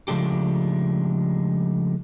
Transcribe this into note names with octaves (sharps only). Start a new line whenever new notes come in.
C#3 F3 G#3 A3 D4 G4